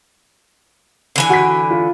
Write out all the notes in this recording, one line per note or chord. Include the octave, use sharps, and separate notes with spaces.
D3 E3 G#5
F#4 B6
F4